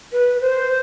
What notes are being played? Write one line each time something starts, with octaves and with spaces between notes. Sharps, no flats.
B4
C5